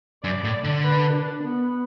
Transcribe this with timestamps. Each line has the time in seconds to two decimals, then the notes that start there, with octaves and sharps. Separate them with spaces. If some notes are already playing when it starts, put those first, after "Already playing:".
0.24 F#2 D5
0.44 A2
0.64 D3
0.84 B4
1.13 D4
1.43 B3